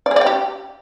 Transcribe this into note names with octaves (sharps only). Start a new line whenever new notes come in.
D5
G#4
D5
G5
G4